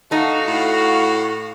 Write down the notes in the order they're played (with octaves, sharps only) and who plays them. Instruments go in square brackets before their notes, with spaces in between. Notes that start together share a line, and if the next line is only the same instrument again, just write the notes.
[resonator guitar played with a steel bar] A3 D#4 [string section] F#4 F5
[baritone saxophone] A2